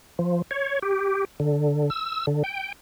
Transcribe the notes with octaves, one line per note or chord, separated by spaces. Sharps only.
F3
C#5
G4
D3
E6
D3
G5